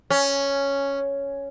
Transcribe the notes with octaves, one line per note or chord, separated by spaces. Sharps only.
C#4